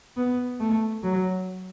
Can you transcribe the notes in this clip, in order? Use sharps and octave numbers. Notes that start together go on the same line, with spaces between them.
B3
A3
F#3